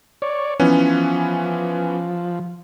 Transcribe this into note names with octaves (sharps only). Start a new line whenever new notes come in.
C#5 D5
E3 F3 B3 C#4